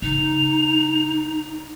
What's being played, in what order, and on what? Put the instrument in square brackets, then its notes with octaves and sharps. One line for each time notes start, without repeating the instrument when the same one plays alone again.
[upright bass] C#3 [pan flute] D#4 [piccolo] F7